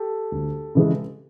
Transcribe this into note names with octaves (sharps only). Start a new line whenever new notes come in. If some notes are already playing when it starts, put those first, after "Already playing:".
Already playing: G4 A4
D2
C#3 E3 G#3